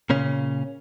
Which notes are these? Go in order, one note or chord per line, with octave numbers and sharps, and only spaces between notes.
A#2 C#3 C#4